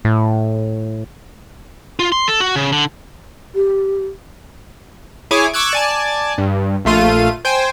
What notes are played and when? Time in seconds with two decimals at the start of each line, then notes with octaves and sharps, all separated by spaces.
0.05 A2
1.99 F4
2.12 C6
2.28 A4
2.40 F#4
2.56 C#3
2.72 D3
3.55 G4
5.31 E4 G#4 C#5 G#5 D6
5.53 C#6 D6 E6 F#6 G#6
5.73 D5 G#5 A5
6.38 G2
6.85 A#1 A3 F4 D#7
7.45 C5 G5 G#5